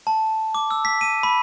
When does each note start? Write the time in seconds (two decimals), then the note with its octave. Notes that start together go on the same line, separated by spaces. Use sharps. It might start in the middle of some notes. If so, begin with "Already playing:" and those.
0.07 A5
0.55 D6
0.71 E6
0.85 B6
1.01 D#7
1.23 B5